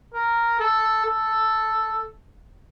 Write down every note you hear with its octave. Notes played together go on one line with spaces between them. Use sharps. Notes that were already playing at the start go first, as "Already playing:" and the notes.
A#4
A4
A4